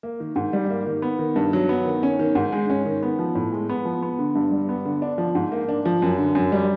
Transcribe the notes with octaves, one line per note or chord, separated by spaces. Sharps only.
A#3
D#3
G#2
G3
A#3
D#3
B3
D#3
G2
F#3
B3
D#3
C#4
D#3
G#2
G#3
C#4
D#3
B3
F3
A2
G#3
B3
F3
B3
D3
G2
G3
B3
D3
D4
F3
G#2
A#3
D4
F3
F#2
D3
F#2
G3